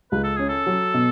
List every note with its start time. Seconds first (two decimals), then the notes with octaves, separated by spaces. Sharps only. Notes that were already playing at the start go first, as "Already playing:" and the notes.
0.12 C#2 B4
0.24 A4
0.36 C#4 G#4
0.48 A4
0.67 F#3
0.94 B2